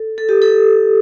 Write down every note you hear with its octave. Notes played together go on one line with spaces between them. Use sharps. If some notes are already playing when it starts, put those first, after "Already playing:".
Already playing: A4
A4
G4
A4